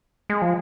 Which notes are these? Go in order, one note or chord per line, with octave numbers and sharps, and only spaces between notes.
G#3
F3